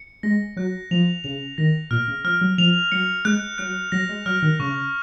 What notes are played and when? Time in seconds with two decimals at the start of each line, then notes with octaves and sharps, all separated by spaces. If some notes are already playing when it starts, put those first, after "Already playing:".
Already playing: C#7
0.23 G#3 A#6
0.57 F#3 F#6
0.91 F3 F7
1.24 C#3 F7
1.58 D#3 A#6
1.91 A#2 F6
2.08 C#3
2.24 F3 F6
2.41 F#3
2.58 F3 F7
2.92 F#3 C#7
3.25 G#3 F#6
3.58 F#3 F#6
3.92 F#3 A#6
4.09 G#3
4.26 F#3 F6
4.43 D#3
4.60 C#3 C#6